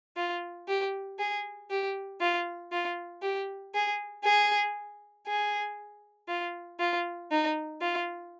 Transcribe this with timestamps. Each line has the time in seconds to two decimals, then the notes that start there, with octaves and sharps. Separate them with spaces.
0.17 F4
0.68 G4
1.19 G#4
1.71 G4
2.21 F4
2.72 F4
3.22 G4
3.74 G#4
4.24 G#4
5.27 G#4
6.28 F4
6.80 F4
7.31 D#4
7.82 F4